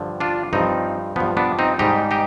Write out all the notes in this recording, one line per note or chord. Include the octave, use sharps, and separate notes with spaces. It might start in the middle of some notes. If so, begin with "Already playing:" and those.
Already playing: G2 D3 F3
D4 F4
G2 F3 C4 D#4
G2 F3 B3
B3 D4
C4 D#4
G#2 G3 D#4 G4
D#4 G4